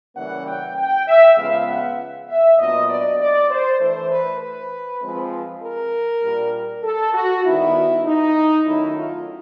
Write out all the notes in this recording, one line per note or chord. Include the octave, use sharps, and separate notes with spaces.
C#3 E3 G3 A#3 C#4 F#5
G5
G5
E5
C#3 F3 G#3 B3 F5
F#5
E5
A#2 F#3 B3 D4 D#5
D5
D5
C5
E3 A3 D4 C5
B4
B4
F3 G#3 C4
A#4
A#2 G3 A#3 D4
A4
F#4
D#3 G3 B3 D#4 E4
D#4
D#3 F#3 A3 C#4 E4
F4